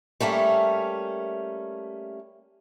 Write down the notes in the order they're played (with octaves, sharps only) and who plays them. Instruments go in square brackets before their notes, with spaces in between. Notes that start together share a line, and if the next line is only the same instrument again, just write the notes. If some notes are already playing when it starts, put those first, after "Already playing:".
[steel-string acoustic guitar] G3 A3 A#3 C#4